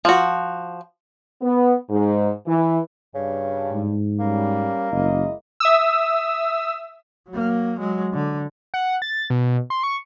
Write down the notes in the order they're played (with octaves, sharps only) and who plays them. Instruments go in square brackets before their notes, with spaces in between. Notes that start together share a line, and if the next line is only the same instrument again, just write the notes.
[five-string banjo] F3 F#4
[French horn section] B3
G#2
E3
[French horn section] G2 [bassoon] C#3
[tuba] G#2
[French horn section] G3 C#4 [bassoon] A#3
[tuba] F#1 [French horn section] G#3 E4 D#5
[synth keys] E5 D#6 E6
[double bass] F#3 A#3
F#3 G#3
D3
[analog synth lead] F#5
A6
B2
C6
C#6